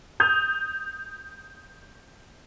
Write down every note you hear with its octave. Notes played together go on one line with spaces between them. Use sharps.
D#6 G6 F7